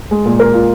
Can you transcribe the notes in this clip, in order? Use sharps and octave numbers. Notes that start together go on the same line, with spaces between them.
G#3
A#2
A#4
F4